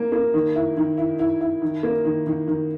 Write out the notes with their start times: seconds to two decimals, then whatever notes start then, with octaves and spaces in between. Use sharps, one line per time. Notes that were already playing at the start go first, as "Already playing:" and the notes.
Already playing: A#3
0.12 A#3
0.34 D#3
0.55 E4
0.77 D#3
0.97 E4
1.19 E4
1.41 E4
1.62 D#3
1.83 A#3
2.05 D#3
2.27 D#3
2.48 D#3